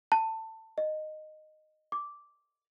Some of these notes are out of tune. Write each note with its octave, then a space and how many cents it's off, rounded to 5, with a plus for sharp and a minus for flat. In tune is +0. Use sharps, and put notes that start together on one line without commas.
A5 +20
D#5 -10
D6 -10